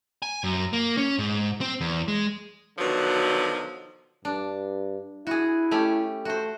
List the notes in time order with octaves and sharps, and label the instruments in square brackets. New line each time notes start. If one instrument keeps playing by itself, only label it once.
[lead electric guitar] G#5
F#2
A#3
C#4
G#2
C4
E2
G#3
[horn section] B2 D3 D#3 F3 F#3
[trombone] G2 [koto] D4
[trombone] E4 [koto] F#4 G#4
[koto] A3 C#4 G4
[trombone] A3 [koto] F#4 C5